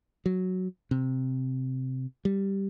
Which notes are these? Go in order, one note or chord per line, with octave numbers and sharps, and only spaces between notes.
F#3
C3
G3